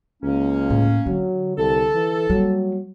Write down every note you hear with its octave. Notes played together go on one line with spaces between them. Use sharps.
C#2 A#3 C#4
A2
D3 F#3
C2 A4
E3
F#3 G3 A#3